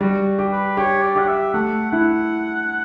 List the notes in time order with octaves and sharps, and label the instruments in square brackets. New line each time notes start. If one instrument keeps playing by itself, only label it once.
[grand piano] G3 [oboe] F#4
[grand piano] G4
[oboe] B4
[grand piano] G4 [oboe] C#5
[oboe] D5
[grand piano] G4 [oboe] F#5
[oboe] E5
[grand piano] A3 [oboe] F#5
[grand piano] E4 [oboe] F#5